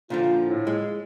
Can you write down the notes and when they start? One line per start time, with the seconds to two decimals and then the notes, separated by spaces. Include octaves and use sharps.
0.10 A#2 D3 F3 F4
0.44 A2
0.67 G#3